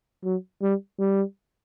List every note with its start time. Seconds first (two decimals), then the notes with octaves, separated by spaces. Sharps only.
0.24 F#3
0.63 G3
0.99 G3